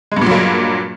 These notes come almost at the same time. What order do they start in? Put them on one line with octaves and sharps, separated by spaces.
G#3 G2 A#2 F#3 A#3